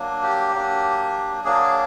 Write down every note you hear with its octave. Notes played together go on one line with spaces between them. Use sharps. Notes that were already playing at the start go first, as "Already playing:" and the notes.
Already playing: F#3 A#3 D4
G4
F#3 A#3 D4
F#3 A#3 D4 G#4